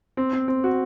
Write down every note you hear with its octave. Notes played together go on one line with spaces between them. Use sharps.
C4
C4
C4
F#4